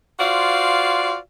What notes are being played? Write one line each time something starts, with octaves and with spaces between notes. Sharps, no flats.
F4 F#4 C5 D5 F5